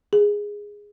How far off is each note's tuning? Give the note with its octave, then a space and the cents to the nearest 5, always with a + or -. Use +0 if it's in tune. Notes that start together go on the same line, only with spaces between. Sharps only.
G#4 -10